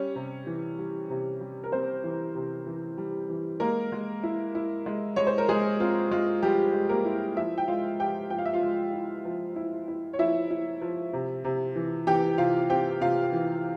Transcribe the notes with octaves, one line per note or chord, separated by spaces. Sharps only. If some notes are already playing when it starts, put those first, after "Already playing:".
Already playing: G3 C#4 C#5
C3
E3
G3
C3
G3
A#4
G3 C4 C5
E3
C3
E3
G3
E3
G#3 A#3 A#4
G#3
E4
E4
G#3
G#3 C#5
C5
A#4
G#3 G#4
C4 F4
G#3 F4
F3 G3 G4
G#3
A#3 A#4
E4
F3 E4 E5
G5
G#3 F4 F5
F3 G4 G5
F3 G5
F5
E5
F4 F5
G#3
E4
F3
E4
E4
C#5
F3 E4 E5
E4
F3
C3
C3
E3
E3 G4 G5
C3 F4 F5
C4 G4 G5
C3 F4 F5
E3